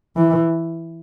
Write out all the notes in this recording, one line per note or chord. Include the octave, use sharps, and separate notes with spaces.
E3